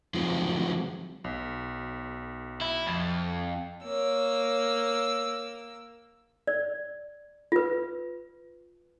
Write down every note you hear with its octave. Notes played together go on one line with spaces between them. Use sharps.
F3 F#3 G#3 C4 D#4 F4
B1
E4
F2
A#3 C#5 E6
D5
F4 B4